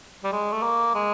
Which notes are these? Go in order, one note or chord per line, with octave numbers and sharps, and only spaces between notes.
G3
G#3
A3
A#3
G#3